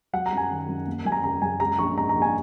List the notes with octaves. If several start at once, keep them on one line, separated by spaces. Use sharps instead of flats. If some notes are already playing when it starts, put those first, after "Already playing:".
F#3 F#5
A#5
F#2 G#5
D#3
F#2
A#3
F#2 G#5
A#5
C#3 A#5
F#2 G#5
G#3 A#5
A#1 C#6
G#2 A#5
A#5
A#1
G#5